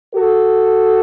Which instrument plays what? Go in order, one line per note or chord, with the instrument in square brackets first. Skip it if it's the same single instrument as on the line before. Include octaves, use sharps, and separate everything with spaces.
[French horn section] F#4 A4